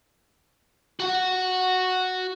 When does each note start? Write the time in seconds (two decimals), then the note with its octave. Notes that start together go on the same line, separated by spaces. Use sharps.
1.00 F#4 F#5